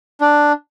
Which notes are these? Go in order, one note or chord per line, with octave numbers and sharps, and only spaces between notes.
D4